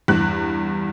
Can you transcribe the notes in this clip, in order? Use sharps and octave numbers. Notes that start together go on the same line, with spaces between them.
E2 G2 F#6